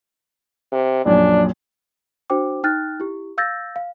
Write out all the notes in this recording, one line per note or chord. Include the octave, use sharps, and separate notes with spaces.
C3
A#1 F#2 A#2 D4
D4 F#4 C5 G5 D6
D#4 G5 F6 F#6 A6
E4 G4
F5 E6 G6 A6 A#6
F5